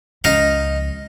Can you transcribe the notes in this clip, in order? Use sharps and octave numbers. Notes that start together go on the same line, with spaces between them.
C#2 F3 D#4 F5